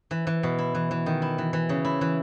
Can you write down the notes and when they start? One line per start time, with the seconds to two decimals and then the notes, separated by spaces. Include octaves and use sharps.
0.11 E3
0.27 E3
0.43 B2
0.58 E4
0.75 E3
0.91 E3
1.06 D#3
1.22 E4
1.38 E3
1.53 E3
1.69 C#3
1.85 E4
2.01 E3